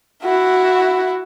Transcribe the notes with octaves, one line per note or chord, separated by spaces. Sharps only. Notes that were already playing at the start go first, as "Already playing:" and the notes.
E4 F#4